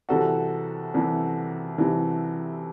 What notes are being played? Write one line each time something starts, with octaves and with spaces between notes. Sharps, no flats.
C2 C3 E3 F#4 A4
C2 C3 E3
C2 C3 E3